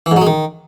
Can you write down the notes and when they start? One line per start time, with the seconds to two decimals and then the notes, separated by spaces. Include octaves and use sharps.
0.06 E3
0.11 G#2
0.16 F#3
0.22 G#3
0.27 D#3